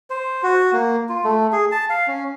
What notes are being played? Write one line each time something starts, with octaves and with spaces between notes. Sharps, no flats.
C5
F#4
A#3
F4
A3
G#4
A5
F5
C#4